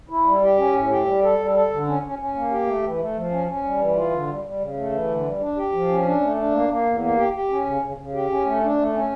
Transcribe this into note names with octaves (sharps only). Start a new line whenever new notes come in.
E4
G3
G4
C#4
A2
G4
G3
A4
G3
A4
D3
C#4
C#4
C#4
A#3
G4
A3
E3
A3
F3
C#4
C#4
G3
E3
F4
D3
G3
G3
C#3
A3
E3
D3
G3
D4
G4
F3
C#4
D4
A3
D4
A#3
A#3
E2
A#3
G4
G4
C#4
C#3
C#3
C#3
G4
C#4
A3
D4
A3
C#4